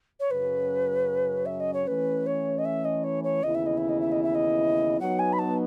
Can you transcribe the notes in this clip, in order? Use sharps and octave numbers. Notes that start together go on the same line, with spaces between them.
C#5
F#2 C#3 F#3 C#4 B4
E5
D#5
C#5
E3 A3 C#4 B4
C#5
D#5
E5
D#5
C#5
C#5
D#2 C#3 E3 B3 E4 D#5
E5
D#5
E5
D#5
E5
D#5
E5
D#5
F#3 B3 D#4 F#5
G#5
B5
A5